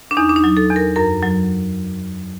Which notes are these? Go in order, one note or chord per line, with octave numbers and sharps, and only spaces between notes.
D4
E2 D#4
D4
D#4
F#3
A4
E2
A#4
F#2 A#4
F#3